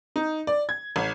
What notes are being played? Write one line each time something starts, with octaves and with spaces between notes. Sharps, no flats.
D#4
D5
G#6
A1